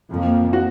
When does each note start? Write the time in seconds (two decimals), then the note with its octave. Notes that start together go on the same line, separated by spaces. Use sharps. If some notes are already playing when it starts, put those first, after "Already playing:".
0.10 F2 F3 A#3
0.53 F#4